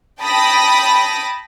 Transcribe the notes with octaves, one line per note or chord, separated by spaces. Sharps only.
G5 A5 B5 D#6 A#6